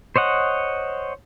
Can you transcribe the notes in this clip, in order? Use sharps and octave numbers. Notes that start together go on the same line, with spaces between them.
C5 C#5 D#5 F#5